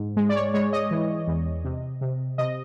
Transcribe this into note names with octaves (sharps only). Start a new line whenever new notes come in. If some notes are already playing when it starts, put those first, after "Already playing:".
Already playing: G#2
G#3
D5
C#5
G#3 C#5
D#5
E3
E2
C3
C3
C3 D#5